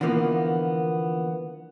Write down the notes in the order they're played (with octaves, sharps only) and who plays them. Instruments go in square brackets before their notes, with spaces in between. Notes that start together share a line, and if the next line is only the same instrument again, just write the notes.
[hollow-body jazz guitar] D3 E3 F3 A#3 B3